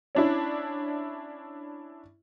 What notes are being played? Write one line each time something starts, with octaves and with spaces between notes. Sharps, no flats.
C#4 D4 E4